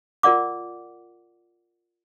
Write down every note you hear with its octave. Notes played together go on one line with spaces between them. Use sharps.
F4 A#4 D5 F#5 D6